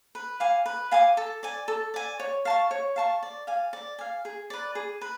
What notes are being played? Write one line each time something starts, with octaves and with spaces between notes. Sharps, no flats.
B4
F5 G#5 D6
B4
F5 G#5 D6
A4
D5 G#5
A4
D5 G#5
C#5
F5 A5 C#6
C#5
F5 A5 C#6
D5
F5 G#5
D5
F5 G#5
G#4
B4 D5
G#4
B4